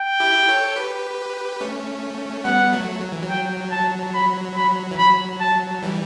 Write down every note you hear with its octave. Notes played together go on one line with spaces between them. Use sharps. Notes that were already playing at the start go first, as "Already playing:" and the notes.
Already playing: G5
E4 G4
A4 C#5
G4 B4
A3 C#4
G3 B3 F#5
F#3 A3
F#3
E3
F#3
G5
A5
B5
B5
E3
F#3 B5
A5
E3 G3